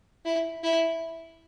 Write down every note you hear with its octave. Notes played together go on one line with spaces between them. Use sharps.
E4
E4